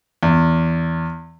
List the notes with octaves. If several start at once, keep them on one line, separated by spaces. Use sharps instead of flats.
E2